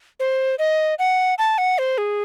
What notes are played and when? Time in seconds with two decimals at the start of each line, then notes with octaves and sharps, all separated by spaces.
0.20 C5
0.59 D#5
0.99 F#5
1.38 A5
1.58 F#5
1.78 C5
1.98 G#4